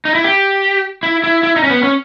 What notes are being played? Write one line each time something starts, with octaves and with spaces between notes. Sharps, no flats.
D#4
E4
G4
E4
E4
E4
D#4
C#4
B3
C#4